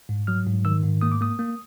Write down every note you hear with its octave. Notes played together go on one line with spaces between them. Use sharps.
G#2
F#3 F6
G#2
D#3 E6
G#2
A#3 D#6
D6
A#3 D#6
A#3